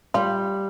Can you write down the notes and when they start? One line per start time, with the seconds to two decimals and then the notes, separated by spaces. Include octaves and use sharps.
0.14 G3 F4